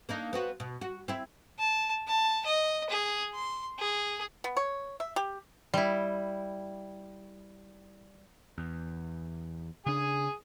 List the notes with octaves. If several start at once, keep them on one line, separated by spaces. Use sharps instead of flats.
A#3 D4 D#4
B3 C4 F#4
B2
F#4
C4 E4
A5
A5
D#5
G#4
C6
G#4
B3
C#5
E5
G4
G3 E4
E2
C#3 D4 G#4 G#5 D#6